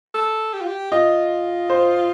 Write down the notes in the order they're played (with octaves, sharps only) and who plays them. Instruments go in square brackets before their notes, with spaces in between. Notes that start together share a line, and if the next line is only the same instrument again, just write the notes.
[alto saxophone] A4
G4
F4
G4
[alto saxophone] F4 [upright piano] D#5
[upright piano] C5